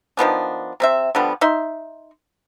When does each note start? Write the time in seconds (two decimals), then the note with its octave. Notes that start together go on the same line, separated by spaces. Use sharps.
0.17 D#3 F3 B3 D4
0.80 C3 C4 E5
1.15 D3 F3 G3 B3
1.41 D#4 E5 C6